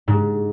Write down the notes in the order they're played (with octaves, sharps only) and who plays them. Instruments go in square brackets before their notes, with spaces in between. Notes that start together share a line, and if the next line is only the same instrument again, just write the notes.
[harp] G#2